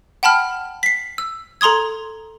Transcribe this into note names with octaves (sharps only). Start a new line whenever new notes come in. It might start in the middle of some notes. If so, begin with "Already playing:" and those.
F#5 G5 A5 B5 F6
B6 C7
E6
A4 A#5 C6 D#6 G#6